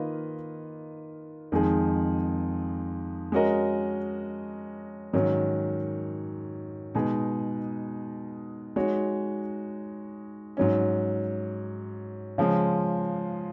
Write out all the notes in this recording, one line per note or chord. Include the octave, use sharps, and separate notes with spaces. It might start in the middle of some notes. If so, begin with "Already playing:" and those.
Already playing: D#3 A#3 F4 B4 D#5
F2 D#3 G#3 D#4 G#4
G#3 C#4 F#4 A#4 D#5
G#2 D#3 F#3 C#4
B2 G#3 D#4 G#4 B4
G#3 D#4 F#4 C#5
G#2 F#3 C#4
C#3 F3 G#3